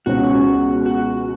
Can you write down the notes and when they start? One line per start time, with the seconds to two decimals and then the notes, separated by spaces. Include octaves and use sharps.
0.06 C#2 B2 G#3 C#4 F#4
0.86 F#4